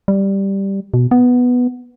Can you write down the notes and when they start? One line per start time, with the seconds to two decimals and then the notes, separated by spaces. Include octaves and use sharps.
0.08 G3
0.94 B2
1.11 B3